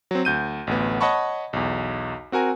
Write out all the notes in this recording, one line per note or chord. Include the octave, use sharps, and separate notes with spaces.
F#3 C4
D2 G6 D#7
A1 D2 B3
C#5 D#5 F#5 A5 B5 C#6
B1 E2
C4 F#4 A#4 G#5